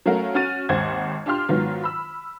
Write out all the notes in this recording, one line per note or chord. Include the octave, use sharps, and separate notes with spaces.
F#3 A3 C#4 A#4 F5 F#5
C#4 F#4 F6 A6 D#7
G#1 D#2 C5 F#5 G#6
D4 F4 G4 C6 F6
G#2 D#3 F#3 B3 F4
B5 E6